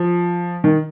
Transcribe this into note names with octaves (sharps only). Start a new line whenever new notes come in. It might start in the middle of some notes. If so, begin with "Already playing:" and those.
Already playing: F3
D#3